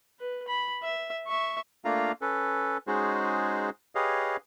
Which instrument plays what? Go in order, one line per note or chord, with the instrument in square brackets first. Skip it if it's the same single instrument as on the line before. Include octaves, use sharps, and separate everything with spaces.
[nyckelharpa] B4
B5
E5
E5 C#6
[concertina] A3 A#3 D4 F4 F5 A#5
C#4 A4 B4
G#3 C#4 D#4 F#4 G#4 C5
G4 G#4 B4 C#5 D#5 F5